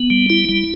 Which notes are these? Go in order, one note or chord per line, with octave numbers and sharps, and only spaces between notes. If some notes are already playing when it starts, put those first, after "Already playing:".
Already playing: B3
G3
E4
G3